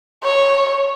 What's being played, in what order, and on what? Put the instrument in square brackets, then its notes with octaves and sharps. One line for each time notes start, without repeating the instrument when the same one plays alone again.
[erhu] C#5